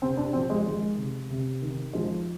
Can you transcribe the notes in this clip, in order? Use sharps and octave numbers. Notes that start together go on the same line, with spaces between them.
C3 C4
D4
F3 C4
G#3
D#3 G#3
C3
C3
D#3
F3 G#3